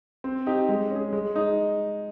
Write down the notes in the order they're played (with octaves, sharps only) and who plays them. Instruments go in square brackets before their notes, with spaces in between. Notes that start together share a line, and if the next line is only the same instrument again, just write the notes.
[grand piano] C4
D#4 G4
G#3
C#4
G#4
G#3
D#4 G#4